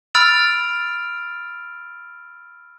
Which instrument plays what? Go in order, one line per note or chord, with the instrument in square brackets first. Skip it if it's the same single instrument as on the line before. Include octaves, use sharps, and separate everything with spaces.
[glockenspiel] B5 E6 F6 A6 D7 F7